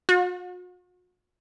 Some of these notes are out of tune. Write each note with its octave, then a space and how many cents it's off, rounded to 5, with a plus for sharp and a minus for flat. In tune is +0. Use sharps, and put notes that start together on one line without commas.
F#4 -45